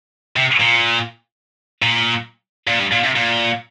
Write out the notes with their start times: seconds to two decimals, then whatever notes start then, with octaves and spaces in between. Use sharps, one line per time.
0.36 C3
0.60 A#2
1.82 A#2
2.68 A#2
2.79 G2
2.92 A#2
3.04 C3
3.16 A#2